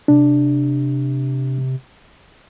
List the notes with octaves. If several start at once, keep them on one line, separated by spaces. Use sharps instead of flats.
C3 D4